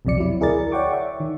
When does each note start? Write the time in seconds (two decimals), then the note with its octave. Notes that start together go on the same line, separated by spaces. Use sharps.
0.05 B1 F2 C3 F3 D5 C#7
0.18 F#3 E4
0.40 D2 E4 G#4 A#4 D5 A6
0.72 C#5 D5 F#5 G5 C#6 D6
0.91 E5 C#6
1.20 D#3